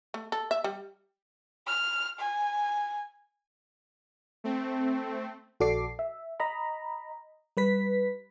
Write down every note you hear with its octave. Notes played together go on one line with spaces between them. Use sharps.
A3
A4
E5
G3
F6
G#5
A3 C4
A#1 F#4 A4 D5 D6 C7
E5
D#5 A#5 B5
G3 B4 B6